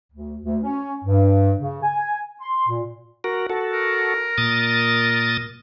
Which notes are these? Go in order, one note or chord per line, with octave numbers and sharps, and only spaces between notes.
D2
D2
C#4
G2
C#3
G#5
C6
A#2
F#4 A#4
F#4 A4
A#4
A#2 D#6 A6